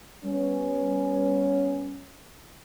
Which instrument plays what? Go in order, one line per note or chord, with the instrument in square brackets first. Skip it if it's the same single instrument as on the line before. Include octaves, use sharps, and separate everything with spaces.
[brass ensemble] G3 B3 C#4